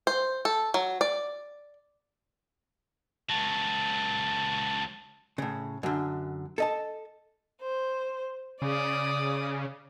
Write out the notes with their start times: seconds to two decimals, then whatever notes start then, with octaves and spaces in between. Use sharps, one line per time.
0.07 C5
0.45 A4
0.74 F#3
1.01 D5
3.30 C#2 F#3 A5
5.38 A2 C#3
5.83 F#2 D3
6.58 A4 D#5 A5
7.62 C5
8.62 C#3 D5 D#6